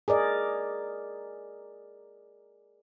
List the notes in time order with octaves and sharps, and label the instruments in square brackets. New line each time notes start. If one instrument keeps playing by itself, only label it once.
[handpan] G#4 A#4 D5 D#5